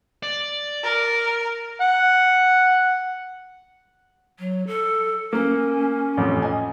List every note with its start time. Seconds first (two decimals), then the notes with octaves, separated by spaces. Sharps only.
0.23 D5
0.83 A#4
1.81 F#5
4.39 F#3
4.67 A4
5.33 A#3 C#4
6.17 A1 F2
6.42 D#5 G#5